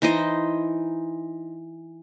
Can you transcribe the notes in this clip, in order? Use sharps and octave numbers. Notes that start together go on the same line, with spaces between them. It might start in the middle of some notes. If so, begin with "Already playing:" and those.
E3 D#4 C5 D#5